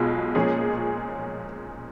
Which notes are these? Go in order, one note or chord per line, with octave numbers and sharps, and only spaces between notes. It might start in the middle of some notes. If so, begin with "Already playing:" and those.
Already playing: B1 B2 G#3 F4
A#2 F3 G#3 C#4 G#4